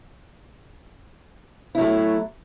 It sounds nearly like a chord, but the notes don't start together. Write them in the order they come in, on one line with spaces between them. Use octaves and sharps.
E4 F#3 A3